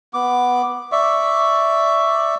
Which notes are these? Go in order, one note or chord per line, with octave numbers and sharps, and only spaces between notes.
B3 D6
D5 E5 C#6